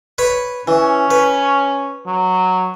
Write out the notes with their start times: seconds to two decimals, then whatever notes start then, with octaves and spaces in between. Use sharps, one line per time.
0.18 B4 C#5 B5
0.68 E3 C#4
1.11 B4
2.06 F#3